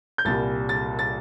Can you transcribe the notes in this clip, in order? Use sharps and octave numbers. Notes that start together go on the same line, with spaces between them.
G6
C2 A#2 G3 A6
A6
A6